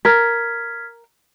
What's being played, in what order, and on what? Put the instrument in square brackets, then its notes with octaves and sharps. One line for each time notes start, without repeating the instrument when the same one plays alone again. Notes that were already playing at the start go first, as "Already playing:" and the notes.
[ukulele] A#4 [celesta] F6 G#6 B6